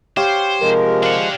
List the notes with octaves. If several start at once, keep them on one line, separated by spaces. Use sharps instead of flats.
G4 C5 C#5 F5
C3 F3 G#3 A#4
D4 F5 F#5